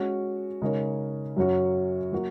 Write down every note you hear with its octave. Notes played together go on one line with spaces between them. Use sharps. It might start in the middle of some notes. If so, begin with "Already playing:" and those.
Already playing: G#3 C#4 F#4
C#3 G#3 D#4 A#4 C#5
F#2 F#3 C#4 F#4 C#5
F#3 A#3 F#4